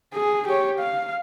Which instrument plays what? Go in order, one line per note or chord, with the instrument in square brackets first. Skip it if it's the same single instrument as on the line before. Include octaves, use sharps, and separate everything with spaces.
[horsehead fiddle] G#4
G4 C#5
F5